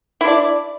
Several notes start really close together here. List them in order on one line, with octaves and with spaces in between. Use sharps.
E4 D4 D5